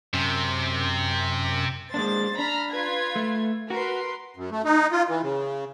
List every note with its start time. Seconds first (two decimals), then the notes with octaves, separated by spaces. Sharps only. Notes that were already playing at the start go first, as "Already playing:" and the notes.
0.14 F#2 C3
1.94 G#3 A#3 D4 C5 A6
2.39 D4 A#5 B5 F6
2.71 F4 B4 G#6
3.16 A3
3.70 F#4 A#4 B4 C6
4.36 F#2
4.51 A3
4.65 D#4
4.92 F4
5.09 E3
5.23 C#3